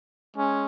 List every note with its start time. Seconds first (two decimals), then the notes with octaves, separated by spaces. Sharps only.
0.37 G#3 C#4